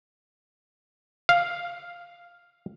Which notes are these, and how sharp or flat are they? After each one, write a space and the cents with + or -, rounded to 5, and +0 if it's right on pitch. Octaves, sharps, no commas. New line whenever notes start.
F5 +0